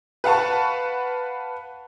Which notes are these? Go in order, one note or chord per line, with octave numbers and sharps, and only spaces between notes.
B4 F5 F#5 A5 C#6